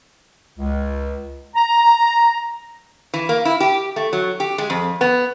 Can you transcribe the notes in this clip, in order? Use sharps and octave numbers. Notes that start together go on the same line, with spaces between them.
C#2
A#5
E3
A#3
E4
G4
A3
F#3
G4
G#3
F2
B3